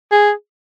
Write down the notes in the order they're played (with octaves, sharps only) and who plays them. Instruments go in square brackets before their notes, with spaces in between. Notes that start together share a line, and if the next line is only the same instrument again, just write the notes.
[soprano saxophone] G#4